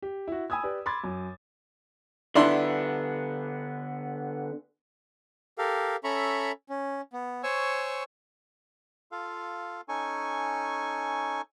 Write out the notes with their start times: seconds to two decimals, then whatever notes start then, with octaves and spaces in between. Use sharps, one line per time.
0.02 G4
0.28 E4 F#4
0.50 G#5 B5 D#6 E6 G#6
0.63 G4 B4 D5
0.86 B5 C6 D6 G#6 A6
1.04 F#2
2.35 D3 B3 D4 E4 C6
5.58 G4 A4 A#4 F5
6.04 C#4 A4 E5 A#5 B5 C#6
6.69 C#4
7.13 B3
7.43 C5 C#5 G#5 C#6 E6
9.12 F4 A4 F5
9.89 C#4 D#4 A4 G#5 C#6